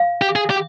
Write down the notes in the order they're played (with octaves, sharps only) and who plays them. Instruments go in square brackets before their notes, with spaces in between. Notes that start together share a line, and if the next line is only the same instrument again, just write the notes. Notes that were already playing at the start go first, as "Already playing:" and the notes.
Already playing: [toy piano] F5
[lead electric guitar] G4
G#4
G4